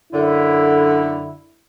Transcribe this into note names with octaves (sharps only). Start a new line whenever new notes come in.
F#2 D3 E4